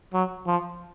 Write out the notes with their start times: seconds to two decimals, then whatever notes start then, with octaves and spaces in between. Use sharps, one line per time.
0.14 F#3
0.47 F3